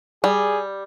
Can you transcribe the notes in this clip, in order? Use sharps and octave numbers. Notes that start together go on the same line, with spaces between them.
G3 G#4